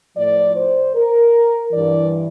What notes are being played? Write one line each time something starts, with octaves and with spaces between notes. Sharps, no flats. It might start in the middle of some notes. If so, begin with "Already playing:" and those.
A2 F3 D5
C5
A#4
G2 E3 D5